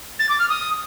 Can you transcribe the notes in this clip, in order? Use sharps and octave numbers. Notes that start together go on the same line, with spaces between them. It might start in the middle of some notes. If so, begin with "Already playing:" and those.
A6
D6
F6
D#6